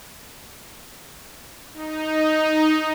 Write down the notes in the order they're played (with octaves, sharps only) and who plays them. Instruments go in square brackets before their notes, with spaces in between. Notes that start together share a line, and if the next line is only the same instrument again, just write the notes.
[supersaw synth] D#4